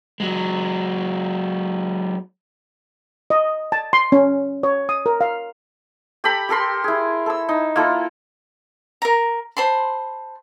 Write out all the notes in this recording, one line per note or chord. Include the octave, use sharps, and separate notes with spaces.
F#3 G#3
D#5
A5
C6
C#4
C#5
D#6
A#4
F5
G4 A4 A#5 B5
G4 A4 A#4 C6
E4 G#4
A4 E6
D#4
A#3 E4 F4 A4
A#4 A#5
C5 A5 B5 C6